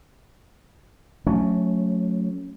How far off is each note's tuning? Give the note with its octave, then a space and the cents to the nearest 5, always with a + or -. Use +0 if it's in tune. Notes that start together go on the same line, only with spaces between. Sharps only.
F#3 -25 A3 +0 C#4 +0